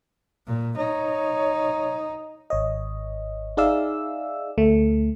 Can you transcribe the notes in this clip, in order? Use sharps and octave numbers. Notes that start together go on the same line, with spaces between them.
A#2
D#4 C#5
G#1 C#5 D#5
D#4 G#4 D5 E5 F5 E6
D2 A3